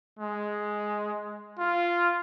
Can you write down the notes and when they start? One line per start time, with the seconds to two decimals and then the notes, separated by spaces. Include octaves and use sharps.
0.19 G#3
1.59 F4